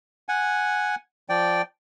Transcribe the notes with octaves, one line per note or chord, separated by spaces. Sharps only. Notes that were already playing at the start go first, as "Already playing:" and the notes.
F#5 G#5
F3 D5 G5